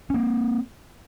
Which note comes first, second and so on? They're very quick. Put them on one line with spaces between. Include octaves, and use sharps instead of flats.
C#4 A#3 C4